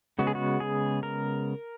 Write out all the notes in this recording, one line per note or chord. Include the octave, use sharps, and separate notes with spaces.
C#3 G#3 B3 F#4
G#4
F#4
G#4
A#4